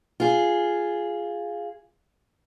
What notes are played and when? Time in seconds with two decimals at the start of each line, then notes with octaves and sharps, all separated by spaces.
0.20 F4 G#4